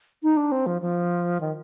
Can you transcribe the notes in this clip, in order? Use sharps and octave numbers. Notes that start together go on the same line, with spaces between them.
D#4
D4
C4
F3
F3
D#3